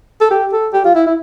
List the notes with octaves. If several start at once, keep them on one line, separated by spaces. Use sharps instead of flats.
A4
G4
A4
G4
F4
E4
E4